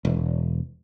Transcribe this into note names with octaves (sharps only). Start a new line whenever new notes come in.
E1